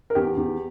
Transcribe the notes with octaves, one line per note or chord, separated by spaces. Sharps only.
A#4
E2 G4
E2